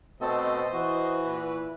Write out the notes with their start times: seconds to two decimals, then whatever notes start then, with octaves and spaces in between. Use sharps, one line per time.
0.21 B2 A3 C4 A4 C5 D#5
0.73 E3 F#4
1.23 A#2 E4 B4